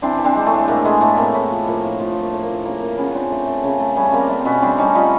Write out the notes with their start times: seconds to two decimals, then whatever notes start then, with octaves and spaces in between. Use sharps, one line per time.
0.02 E3 C4 D4
0.19 E3
0.24 C4 D4
0.35 G#3
0.46 A3
0.52 A2
0.68 A2 A#3
0.84 G#3 A3 B3
1.01 A2 A3 B3
1.17 A2 A#3 C4
1.34 A2 A3 B3
1.50 F3
1.67 F3 A#3
1.83 A2
2.00 F3 A3
2.16 A2
2.21 A#3
2.33 A2
2.43 A#3
2.49 F3
2.65 C#3 A#3
2.81 C#3 A#3
2.98 C#3 B3 C#4
3.14 C#3 C4 D4
3.32 A3
3.47 A3
3.64 C#3
3.80 A3
3.96 G3 B3 C#4
4.13 G3 A#3 C4
4.30 G3 A3 B3
4.40 C4
4.45 B2 B3 C#4
4.62 G3 C4 D4
4.78 G3 C#4 D#4
4.95 G3 D#4 F4